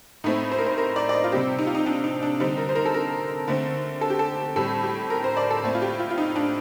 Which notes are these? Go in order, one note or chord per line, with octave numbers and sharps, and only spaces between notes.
A2 A3 C4 D#4
C5
A#4
C5
A#4
D5
D5
D#5
F4
C3 G3 C4 G4
D#4
F4
D#4
D4
D#4
D4
D3 G3 C4 D#4
A#4
C5
A#4
A4
A#4
D3 A3 C4
A4
G4
A4
A2 G3 C4 A4
G4
A#4
C5
D5
A4
A2 A3 C4
F4
G4
F4
F4
D#4
D4